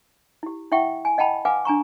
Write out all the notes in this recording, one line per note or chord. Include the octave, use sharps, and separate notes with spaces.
E4 G4
E4 E5 F#5 G5 C#6
G#5
D#5 F#5 G5 A5 B5
B4 F5 F#5 G#5 D6
D4 G#5 A#5 C#6